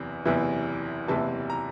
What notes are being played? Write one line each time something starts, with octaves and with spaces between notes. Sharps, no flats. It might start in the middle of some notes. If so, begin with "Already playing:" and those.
Already playing: F#1 E2 C3 E3
F#1 E2 C3 E3
F#1 E2 C3 E3 A5
A#5